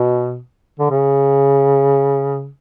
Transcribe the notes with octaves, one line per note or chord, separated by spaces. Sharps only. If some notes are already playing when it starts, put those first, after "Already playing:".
Already playing: B2
D3
C#3